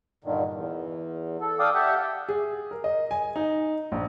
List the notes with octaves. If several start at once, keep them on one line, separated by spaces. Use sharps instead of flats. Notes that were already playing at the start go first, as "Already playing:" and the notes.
G2 A#2 D3 D#3
E2
A4
A4 D5 F5 G5 D6 D#6
G4 E5 F#5 G5 A5
G#4
A#4
D#5
G#5
D#4
A#1